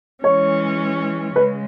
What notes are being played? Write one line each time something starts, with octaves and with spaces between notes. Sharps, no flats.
E3 G#3 C#4 C#5
C#3 G#3 B4